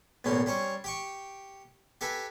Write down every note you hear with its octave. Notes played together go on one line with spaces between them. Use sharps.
B1 E2 A2 A#3 C#4 C6
G3 C#4 C5 C#5
G4 G5 C#6
G4 A4 B4 E5 G#5